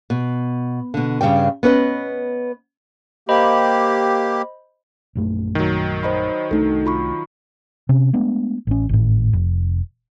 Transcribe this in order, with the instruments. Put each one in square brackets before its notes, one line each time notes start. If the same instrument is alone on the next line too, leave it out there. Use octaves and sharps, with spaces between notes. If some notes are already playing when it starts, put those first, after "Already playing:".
[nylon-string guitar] B2
B2 D3
G2 C#3 G3 G5
B3 C#4 B4 D#5
[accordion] A#3 G4 [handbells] C5 D#5 B5
[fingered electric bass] A#1 F#2 A3
[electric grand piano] D#3 F#3
[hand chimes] C5 D#5 B5
[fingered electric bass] C2 A3 D4 [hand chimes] D#4 A4
[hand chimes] F4 B5 C#6
[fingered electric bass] C3 C#4
G#3 A3 B3 D4
A1 C#4
G#1 A2
F1